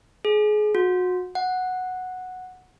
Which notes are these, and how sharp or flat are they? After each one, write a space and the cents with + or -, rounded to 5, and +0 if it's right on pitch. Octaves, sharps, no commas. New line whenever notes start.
G#4 +30
F#4 -30
F#5 -5